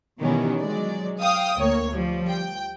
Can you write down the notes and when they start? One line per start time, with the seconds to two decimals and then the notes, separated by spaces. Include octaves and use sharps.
0.19 B2 D#3 E3 G3 B3 C#4
0.62 F#3 G#3 D5
1.19 F5 G5 D#6
1.58 D2 A#3 C#5
1.93 F3 G3
2.29 G5